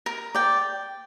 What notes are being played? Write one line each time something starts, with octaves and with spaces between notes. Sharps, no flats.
A#4
D5 G5